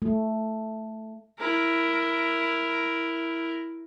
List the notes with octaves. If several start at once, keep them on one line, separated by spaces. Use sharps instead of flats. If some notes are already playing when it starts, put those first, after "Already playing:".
A3
E4 A#4